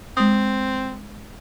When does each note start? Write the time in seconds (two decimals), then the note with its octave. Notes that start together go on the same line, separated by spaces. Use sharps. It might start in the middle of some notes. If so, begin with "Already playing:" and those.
0.17 G#3 C4 D#6